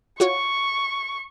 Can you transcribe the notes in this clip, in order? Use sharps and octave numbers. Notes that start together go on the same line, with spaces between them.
F4 F#4 C#5 C#6